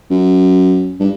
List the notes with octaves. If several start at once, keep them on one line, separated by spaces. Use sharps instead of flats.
F#2
G2